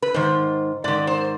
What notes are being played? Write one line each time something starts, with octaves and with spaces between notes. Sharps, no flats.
B4
G#2 D#3 C5
G#2 D#3 D5
C5